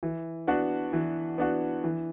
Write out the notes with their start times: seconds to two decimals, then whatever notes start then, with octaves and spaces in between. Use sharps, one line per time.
0.03 E3
0.47 B3 D4 F#4
0.93 E3
1.38 B3 D4 F#4
1.84 E3